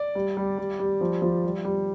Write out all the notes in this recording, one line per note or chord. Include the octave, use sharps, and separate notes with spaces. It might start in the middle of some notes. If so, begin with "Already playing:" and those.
Already playing: D5
G3
G3
G3
G3
F3
F3
G3
G3